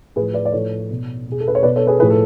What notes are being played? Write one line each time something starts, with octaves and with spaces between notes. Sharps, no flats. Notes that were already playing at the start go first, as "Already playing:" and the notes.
A2 F3 G#4 B4
B4 D5
D5
A2 F3 A4 C#5
B2
B2 G#4
A4
B4
C#5
B2 B4 D5
A4 C#5
G#4 B4
A2 F3 G#4 B4
A4